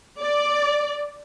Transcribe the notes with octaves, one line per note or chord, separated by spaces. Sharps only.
D5